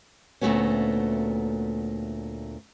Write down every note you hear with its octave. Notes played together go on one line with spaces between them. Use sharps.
D2 A#2 D#3 A3 B3 C#4